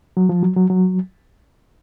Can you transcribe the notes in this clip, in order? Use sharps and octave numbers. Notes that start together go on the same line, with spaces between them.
F#3
F3
F#3
F#3
F#3